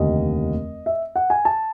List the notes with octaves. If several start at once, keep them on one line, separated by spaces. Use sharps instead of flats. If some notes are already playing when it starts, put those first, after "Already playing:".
Already playing: F1 D#2 D3 D#5
E5
F#5
G#5
A5